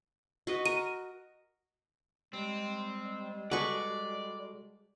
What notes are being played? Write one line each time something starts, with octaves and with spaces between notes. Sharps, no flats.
F#4 B4 D#5
A#4 D#7
G3 G#3 C4
F#4 G#4 A4 B4 D5 C#6